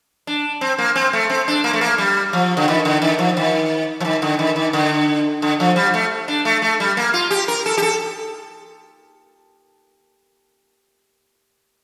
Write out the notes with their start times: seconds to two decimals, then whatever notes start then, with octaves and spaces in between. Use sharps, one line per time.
0.27 D4
0.61 C4
0.78 A#3
0.96 C4
1.13 A3
1.30 C4
1.48 D4
1.64 A#3
1.73 A3
1.81 A#3
1.98 G3
2.33 F3
2.57 D3
2.68 D#3
2.85 D3
3.02 D#3
3.19 F3
3.37 D#3
4.00 F3
4.05 D#3
4.22 D3
4.39 D#3
4.56 D#3
4.73 D3
5.42 D3
5.60 F3
5.76 G3
5.94 A3
6.28 D4
6.45 A3
6.62 A3
6.80 G3
6.97 A#3
7.14 F4
7.31 G4
7.48 A#4
7.66 A4
7.78 G4
7.82 A4